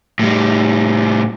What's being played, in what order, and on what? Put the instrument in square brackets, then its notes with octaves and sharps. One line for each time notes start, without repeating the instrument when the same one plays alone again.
[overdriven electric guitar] A2 G3